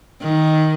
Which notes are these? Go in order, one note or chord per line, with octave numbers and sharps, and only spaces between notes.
D#3